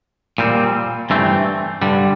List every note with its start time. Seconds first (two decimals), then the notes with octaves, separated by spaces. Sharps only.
0.38 A#2 G3 C4
1.10 G2 E3 A3 C4
1.82 G2 D3 G3